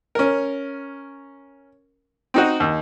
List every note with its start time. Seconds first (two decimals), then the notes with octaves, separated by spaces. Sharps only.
0.15 C#4 A#4
2.34 C4 D#4 F#4
2.60 D#2